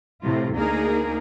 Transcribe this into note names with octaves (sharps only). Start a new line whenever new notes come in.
A2 C3 F4
D2 A#3 D#4 G#4 A#4